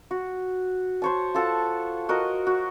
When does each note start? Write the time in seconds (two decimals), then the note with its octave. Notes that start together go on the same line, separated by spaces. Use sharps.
0.11 F#4
1.02 C5 C#5 A5
1.34 F4 A4 F#5 A5
2.09 F#4 A#4 D#5
2.47 F#4